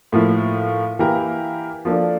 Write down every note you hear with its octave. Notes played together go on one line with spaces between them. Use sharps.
A2 F3 A#3 E4
E3 A#3 E4 G4 A#4
F3 A#3 D4 A4